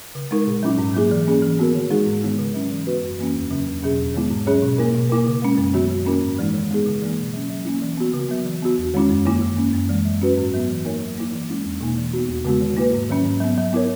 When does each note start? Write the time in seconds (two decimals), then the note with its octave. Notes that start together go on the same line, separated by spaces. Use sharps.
0.15 C#3
0.31 G#3 D#4 A#4
0.47 A#2
0.63 F#3 C#4 E4
0.78 G#2
0.94 F#3 A#3 E4 G#4
1.11 E3
1.27 A#3 C#4 G#4
1.43 E3
1.59 B3 F#4 A#4
1.75 D#3
1.91 G#3 D#4 G#4
2.06 G#2
2.23 D#3 G#3 B3 E4
2.39 C#3
2.54 F#3 C#4 E4
2.71 E3
2.86 B3 F#4 B4
3.02 F#2
3.19 E3 A#3 C#4
3.34 E2
3.51 C#3 F#3 C#4
3.67 E2
3.83 B2 F#3 C#4 G#4
3.98 E2
4.14 D#3 G#3 B3 E4
4.30 G#2
4.46 F#3 C#4 G#4 C#5
4.63 B2
4.78 A#3 E4 A#4
4.95 B2
5.10 A#3 E4 A#4
5.27 C#3
5.42 G#3 C#4
5.58 F#2
5.74 D#3 F#3 B3 F#4
5.90 D#3
6.05 A#3 C#4 E4 A#4
6.22 G#2
6.39 E3 G#3 D#4
6.54 D#3
6.71 G#3 B3 D#4 G#4
6.86 C#3
7.02 E3 A#3
7.17 B2
7.34 F#3 C#4
7.50 F#3
7.65 A#3 C#4 E4
7.82 E3
7.97 B3 F#4
8.14 C#3
8.29 F#3 B3
8.45 E3
8.62 B3 F#4
8.78 E2
8.94 D#3 G#3 C#4 E4
9.10 F#2
9.26 D#3 A#3 E4
9.41 D#3
9.57 A#3 C#4
9.73 F#2
9.89 E3 G#3
10.05 F#3
10.22 C#4 F#4 B4
10.37 G#2
10.54 F#3 B3
10.70 E3
10.85 A#3 D#4 A#4 C#5
11.01 F#3
11.18 A#3 E4
11.33 E3
11.49 G#3 C#4 E4
11.65 E2
11.81 B2 A#3 D#4
11.97 E3
12.13 B3 F#4
12.29 E2
12.45 C#3 G#3 B3 F#4
12.61 D#3
12.77 A#3 E4 B4
12.93 G#2
13.09 D#3 F#3 C#4
13.25 G#2
13.40 F#3 B3
13.57 F#3
13.73 B3 E4 A#4 C#5